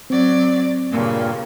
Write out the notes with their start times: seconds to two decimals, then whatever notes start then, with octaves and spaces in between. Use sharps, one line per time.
0.10 F#3 C4 D5
0.91 G2 A#2 C#3 A#3